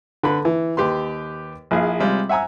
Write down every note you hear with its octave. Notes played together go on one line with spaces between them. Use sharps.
D3 B4 B5
E3
D#2 G4 B4 C6
A#1 E4 G#4 F5
C3 G3 G#3 F4
E5 F#5 G#5 A#5 E6